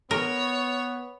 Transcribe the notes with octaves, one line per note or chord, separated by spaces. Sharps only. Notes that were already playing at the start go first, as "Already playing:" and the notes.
B3 A#4 C#5